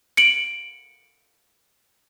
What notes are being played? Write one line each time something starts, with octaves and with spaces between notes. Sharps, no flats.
C#7 D7 F#7